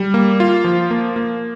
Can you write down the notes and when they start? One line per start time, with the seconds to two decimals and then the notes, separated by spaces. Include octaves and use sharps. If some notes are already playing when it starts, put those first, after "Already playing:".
Already playing: G3
0.14 A#3
0.40 F4
0.64 F3
0.91 A#3
1.16 A#3